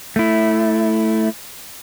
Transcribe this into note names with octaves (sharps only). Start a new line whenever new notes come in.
A3 E4